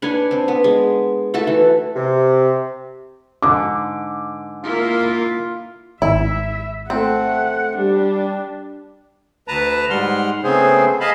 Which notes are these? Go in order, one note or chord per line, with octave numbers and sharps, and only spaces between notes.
D4 B4 C#5 G#5
C4 D4
B3
G#3
A3 F#4 A4 A5
E3
C3
G#2 D3 D6
A#3 E4 F4
G#1 E4 E5
A3 C4 F#5
G3 D4
D2 B4 A5 A#5
G#2 G3 F#5 C6 F6
C#3 A3 B3 C4 G#4 C5
G#4 D#5 F5 A5 B5